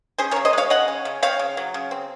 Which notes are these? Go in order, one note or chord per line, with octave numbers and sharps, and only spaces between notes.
C#4 G#4 C5
A#4 C#5
C#3
C5 D#5
G#3 C#5 F5
C#3 D#5 F#5
C#4
C#3
C4 C#5 F5
C#3
F#3
C#3
C4